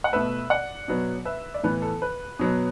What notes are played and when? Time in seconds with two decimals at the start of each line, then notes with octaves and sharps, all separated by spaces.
0.04 F#5
0.13 B2 A3 B4 E5
0.50 D5 F#5
0.88 B2 F#3 B3
1.25 B4 E5
1.54 D5
1.63 A2 E3 B3 B4
1.82 A4
2.02 B4
2.39 B2 F#3 B3